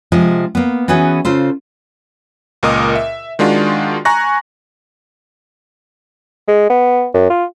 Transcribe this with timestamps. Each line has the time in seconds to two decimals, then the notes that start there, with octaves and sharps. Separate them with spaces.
0.12 C3 F3 G#3
0.55 A#3 B3
0.88 E3 B3 C#4 F#4 G#4
1.25 C#3 F4 A4 C5
2.63 C#2 A#2 A#4 D#5 D6 D#6
2.95 E5
3.39 D#3 G#3 D4 F4 F#4
4.05 G#5 A#5 C#6 F#6 A#6
6.48 G#3
6.70 B3
7.14 F#2
7.30 F4